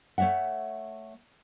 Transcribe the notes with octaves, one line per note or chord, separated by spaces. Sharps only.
A3 C#5 D5 E5 F#5